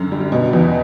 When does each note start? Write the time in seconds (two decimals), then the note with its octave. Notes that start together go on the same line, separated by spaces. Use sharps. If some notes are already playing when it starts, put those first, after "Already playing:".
Already playing: F#2 D3 C#4
0.12 G3
0.32 B2
0.53 E2